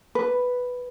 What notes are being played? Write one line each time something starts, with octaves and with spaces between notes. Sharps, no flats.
B4